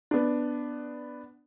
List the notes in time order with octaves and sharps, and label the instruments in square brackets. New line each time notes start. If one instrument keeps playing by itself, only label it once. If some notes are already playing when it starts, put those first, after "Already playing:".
[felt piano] B3 D4